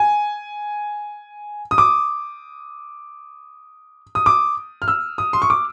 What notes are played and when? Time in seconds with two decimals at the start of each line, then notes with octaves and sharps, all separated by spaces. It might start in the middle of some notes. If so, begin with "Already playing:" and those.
Already playing: G#5
1.71 D#6
1.78 D6
4.15 D#6
4.26 D6
4.82 F6
4.88 E6
5.18 D#6
5.33 C6
5.42 C#6
5.50 D6